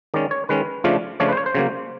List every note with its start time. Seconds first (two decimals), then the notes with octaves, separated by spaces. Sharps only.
0.14 D#3 G#3 C#4 D5
0.31 C#5
0.49 D#3 G#3 C#4 B4
0.84 C#3 F3 A3 D4 F4
1.20 C#3 F3 A3 D4 F4 C#5
1.28 B4
1.33 C5
1.37 C#5
1.46 C5
1.55 C#3 F#3 A#3